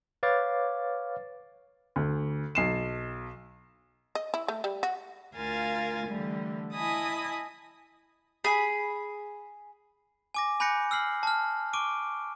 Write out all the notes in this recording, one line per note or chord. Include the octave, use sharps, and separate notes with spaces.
B4 C#5 F5 D6 A6
D2
B1 C7 E7
D#5
E4
A3
G3
F#4
D2 F4 A#4 F5 G#5 A6
D3 E3 G3 A3
E4 D#5 G#5 A5 B5 D#6
G#4 B5
G#5 D6 A#6
G#5 B5 F#6 G6 A#6 C#7
E6 F6 C7 F#7
A5 F6
C#6 D6 D7 D#7